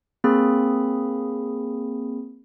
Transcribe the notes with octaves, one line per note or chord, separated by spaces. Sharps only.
A#3 C4 G#4 B5